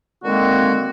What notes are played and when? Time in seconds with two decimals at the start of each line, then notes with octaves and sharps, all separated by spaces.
0.24 D3 D#3 G#3 A#3 C4 F#4